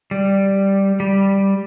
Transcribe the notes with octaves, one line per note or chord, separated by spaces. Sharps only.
G3
G3